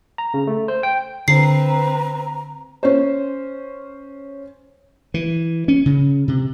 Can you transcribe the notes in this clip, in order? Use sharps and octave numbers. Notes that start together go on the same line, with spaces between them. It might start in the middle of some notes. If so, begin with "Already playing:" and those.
A#5
C#3
A3
C5
G5
D3 C4 B4 A#5 C7
C#4 C5
E3
C#4
C#3
C3